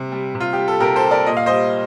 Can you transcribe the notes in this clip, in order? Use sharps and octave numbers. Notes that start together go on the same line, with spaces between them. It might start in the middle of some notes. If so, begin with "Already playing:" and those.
Already playing: C3 G3
G3
C3
F4
G4
G3
A4
C3 G4 A#4
A4 C5
G3
A#4 D5
A#2 D#5
F5
G3 C5 D#5